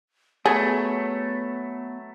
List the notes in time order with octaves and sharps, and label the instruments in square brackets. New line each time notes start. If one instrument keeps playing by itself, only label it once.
[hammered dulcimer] F#3 B4 [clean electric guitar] A3 [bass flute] B3 [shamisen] G#4